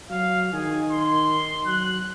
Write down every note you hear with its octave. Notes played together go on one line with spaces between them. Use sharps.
F#3 F5
D#3 G#4
C6
F#3 F#6